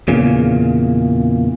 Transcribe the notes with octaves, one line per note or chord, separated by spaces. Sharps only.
E2 A#2 C#3